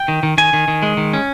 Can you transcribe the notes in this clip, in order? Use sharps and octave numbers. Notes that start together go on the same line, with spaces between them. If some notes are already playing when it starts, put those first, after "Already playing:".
Already playing: G5
D#3
D#3
D#3 G#5
D#3
D#3
G#3
D#3
C#4